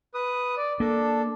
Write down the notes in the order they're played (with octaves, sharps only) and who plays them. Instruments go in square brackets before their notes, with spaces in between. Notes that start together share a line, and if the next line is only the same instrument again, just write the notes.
[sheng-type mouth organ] B4 D#6
D5
[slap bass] A#3 [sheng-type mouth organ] D4 A4